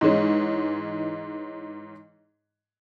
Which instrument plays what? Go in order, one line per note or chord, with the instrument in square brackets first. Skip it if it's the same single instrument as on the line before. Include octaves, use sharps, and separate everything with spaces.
[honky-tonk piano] G#2 E3 G#3 C#4